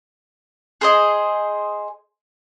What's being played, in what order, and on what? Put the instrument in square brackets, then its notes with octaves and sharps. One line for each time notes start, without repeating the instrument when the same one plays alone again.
[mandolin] G#4 C5 D#5